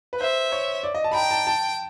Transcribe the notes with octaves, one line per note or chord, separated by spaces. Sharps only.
B4
C5 E5
C#5
D5
D#5
A5
B5
G5 A#5
A5
A5